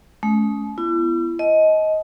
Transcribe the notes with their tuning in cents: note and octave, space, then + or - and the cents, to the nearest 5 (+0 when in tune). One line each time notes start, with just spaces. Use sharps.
A3 -45 C#4 +15
B3 +0 E4 +40
D#5 +15 A5 -40